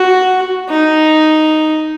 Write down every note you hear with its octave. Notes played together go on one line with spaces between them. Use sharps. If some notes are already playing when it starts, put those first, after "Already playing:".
Already playing: F#4
D#4